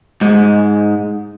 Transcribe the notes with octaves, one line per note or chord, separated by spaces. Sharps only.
G#2 G#3